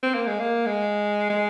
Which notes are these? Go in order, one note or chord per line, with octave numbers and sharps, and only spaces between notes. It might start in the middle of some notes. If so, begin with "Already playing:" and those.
C4
A#3
G#3
A#3
G#3
G#3